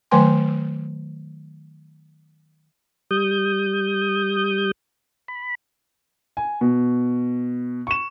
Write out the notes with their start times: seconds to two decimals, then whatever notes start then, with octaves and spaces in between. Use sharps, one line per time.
0.11 D#3 F#3 A3 B4 G#5 C6
3.11 G3 D#6 G6
5.28 B5
6.37 G#5
6.61 B2
7.87 C#6 E7